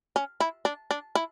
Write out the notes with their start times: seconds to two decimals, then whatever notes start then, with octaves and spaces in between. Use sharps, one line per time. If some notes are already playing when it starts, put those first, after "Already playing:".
0.16 C#4
0.40 E4
0.65 D4
0.91 D4
1.15 E4